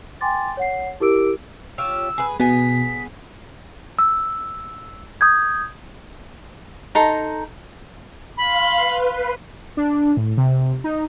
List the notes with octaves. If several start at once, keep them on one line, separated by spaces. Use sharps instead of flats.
G5 G#5 C6 D6 A6
C#5 F#5 C7
E4 G4 A#4 D6 E6 D7
F4 G4 C#5 E6
G#4 B4
B2 B3 G#4 B6
E6
D#6 G6 G#6
D#4 A4 A#5 C6
F5 B5 C6
B4
D4
A2
C3
D#4